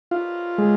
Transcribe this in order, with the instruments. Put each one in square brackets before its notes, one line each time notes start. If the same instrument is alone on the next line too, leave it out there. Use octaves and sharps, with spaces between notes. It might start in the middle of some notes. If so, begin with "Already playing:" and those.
[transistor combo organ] F4
G#3